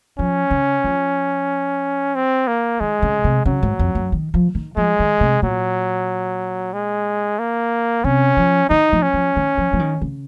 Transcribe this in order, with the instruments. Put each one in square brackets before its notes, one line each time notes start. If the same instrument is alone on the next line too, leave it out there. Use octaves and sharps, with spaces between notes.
[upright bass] F3 [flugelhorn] C#4
[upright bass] C#3
F3
[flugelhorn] C4
A#3
[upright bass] D#3 [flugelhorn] G#3
[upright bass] C#3
C3
[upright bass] C#3 [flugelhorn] F#3
[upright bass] G#2
F2
F#2
D#3
F3
D#3
[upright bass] F3 [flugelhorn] G#3
[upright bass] D#3
C3
[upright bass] A#2 [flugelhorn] F#3
[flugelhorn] G#3
A#3
[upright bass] C3 [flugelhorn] C#4
[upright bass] F3
[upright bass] D#3 [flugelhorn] D#4
[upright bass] F3
[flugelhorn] C#4
[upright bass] F3
D#3
F3
F3
D#3
C#3